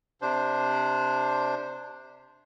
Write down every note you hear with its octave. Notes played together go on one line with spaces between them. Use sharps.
C3 D4 C5